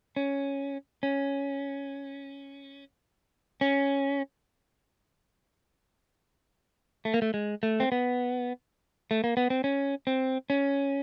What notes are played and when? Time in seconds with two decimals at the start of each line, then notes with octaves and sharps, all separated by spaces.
0.17 C#4
1.03 C#4
3.61 C#4
7.05 A3
7.14 A#3
7.22 A3
7.34 G#3
7.63 A3
7.80 C4
7.92 B3
9.11 A3
9.24 A#3
9.37 B3
9.50 C4
9.64 C#4
10.07 C4
10.50 C#4